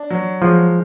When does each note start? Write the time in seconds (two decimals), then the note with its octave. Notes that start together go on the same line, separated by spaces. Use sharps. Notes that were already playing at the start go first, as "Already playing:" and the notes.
Already playing: D4
0.11 F#3
0.42 F3 G#3